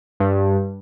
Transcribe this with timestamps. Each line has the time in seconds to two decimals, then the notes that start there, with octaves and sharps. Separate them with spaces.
0.20 G2